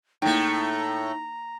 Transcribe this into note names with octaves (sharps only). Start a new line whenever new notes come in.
A2 A3 A#3 D#4 E4 G#4 G5 A#5